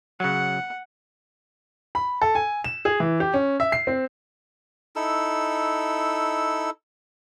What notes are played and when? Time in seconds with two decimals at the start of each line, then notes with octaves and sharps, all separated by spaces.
0.20 C#3 F#3 F#5
1.95 B5
2.21 A4
2.35 G#5
2.64 E7
2.85 G#4
3.00 E3
3.20 G4
3.34 C#4
3.60 E5
3.72 C7
3.87 C4
4.96 D#4 E4 A4 E6